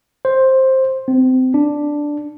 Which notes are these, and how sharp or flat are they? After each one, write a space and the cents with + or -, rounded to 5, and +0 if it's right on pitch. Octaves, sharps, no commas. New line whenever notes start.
C5 +10
C4 -25
D4 +0